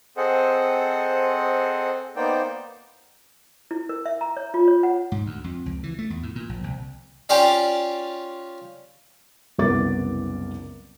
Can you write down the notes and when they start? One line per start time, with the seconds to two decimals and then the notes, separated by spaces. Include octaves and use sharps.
0.17 C4 G#4 A4 C5 D#5 F#5
2.16 A#3 B3 D#4 C5 D5 G5
3.71 E4
3.89 A#4
4.06 E5
4.21 A#5
4.37 C#5
4.54 F4
4.68 C#5
4.83 F#5
5.12 G#2
5.26 D2
5.44 F2
5.66 C#2
5.83 E3
5.98 A3
6.10 E2
6.23 A2
6.36 A#2
6.49 A#1
6.64 C2
7.29 C#4 F4 G4 D5 F5
9.58 F#1 C2 B3 A#4 D6 A6